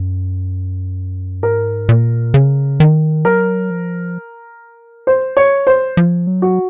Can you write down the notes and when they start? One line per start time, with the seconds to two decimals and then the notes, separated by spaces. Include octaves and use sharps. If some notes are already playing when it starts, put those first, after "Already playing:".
Already playing: F#2
1.43 G#2 A#4
1.89 A#2
2.34 C#3
2.80 D#3
3.25 F#3 A#4
3.70 F3
5.07 C5
5.37 C#5
5.67 C5
5.97 F3
6.27 F#3
6.42 F#4